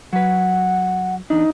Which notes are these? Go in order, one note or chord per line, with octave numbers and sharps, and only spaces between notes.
F#3 B4 F#5
E2 D4 D#4